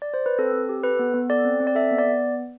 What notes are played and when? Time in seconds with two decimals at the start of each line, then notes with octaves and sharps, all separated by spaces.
0.02 D5
0.14 C5
0.26 B4
0.38 C4 A4
0.53 C4
0.69 G4
0.84 A4 B4
0.99 B3
1.14 B3
1.30 A4 D5
1.45 C4
1.60 C4
1.67 D5
1.75 A4 E5
1.91 B3
1.98 D5
2.06 B3